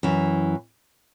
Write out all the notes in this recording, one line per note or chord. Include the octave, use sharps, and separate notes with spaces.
F#2 E3